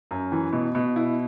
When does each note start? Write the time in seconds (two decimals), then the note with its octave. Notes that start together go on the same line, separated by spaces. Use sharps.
0.11 F#2
0.32 E3
0.53 B2
0.75 B2
0.96 E4